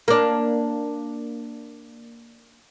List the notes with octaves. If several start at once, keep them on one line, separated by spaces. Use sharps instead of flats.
A#3 D4